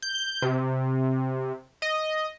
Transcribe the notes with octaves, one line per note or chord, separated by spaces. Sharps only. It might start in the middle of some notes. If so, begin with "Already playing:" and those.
G6
C3
D#5